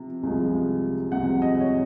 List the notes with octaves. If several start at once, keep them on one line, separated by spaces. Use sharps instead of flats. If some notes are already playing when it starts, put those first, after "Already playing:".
Already playing: C3 F3
C2 C3 F3 G#3
C2 C3 F3 G#3 F#5
D#5
C#5